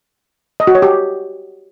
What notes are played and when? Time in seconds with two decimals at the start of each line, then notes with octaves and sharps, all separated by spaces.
0.60 D#5
0.67 F#4
0.75 C#5
0.82 G4